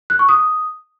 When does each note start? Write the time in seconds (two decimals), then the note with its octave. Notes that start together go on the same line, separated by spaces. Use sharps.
0.10 F#6
0.19 C#6
0.29 D#6